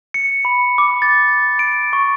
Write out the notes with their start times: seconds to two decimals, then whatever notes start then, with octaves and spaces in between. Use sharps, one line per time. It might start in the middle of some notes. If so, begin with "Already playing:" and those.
0.14 C#7
0.45 B5
0.78 D6
1.02 A6
1.59 D7
1.93 C#6